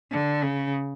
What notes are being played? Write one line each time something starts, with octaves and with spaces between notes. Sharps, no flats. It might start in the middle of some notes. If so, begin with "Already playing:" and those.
D3
C#3